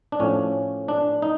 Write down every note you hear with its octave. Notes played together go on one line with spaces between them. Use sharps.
D4
A2 F3 C#4
D4
D#4